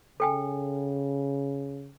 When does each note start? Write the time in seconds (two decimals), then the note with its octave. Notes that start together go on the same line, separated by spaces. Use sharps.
0.20 C#3 A4 G5 G#5